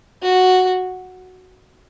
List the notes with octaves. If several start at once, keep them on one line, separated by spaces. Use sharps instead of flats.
F#4